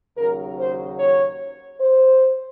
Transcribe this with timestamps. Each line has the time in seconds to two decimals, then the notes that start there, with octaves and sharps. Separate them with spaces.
0.17 D#2 C#3 F#3 A#4
0.57 C5
0.97 C#5
1.79 C5